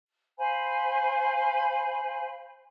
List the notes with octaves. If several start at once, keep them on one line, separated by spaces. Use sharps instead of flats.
C5 F5 G#5 B5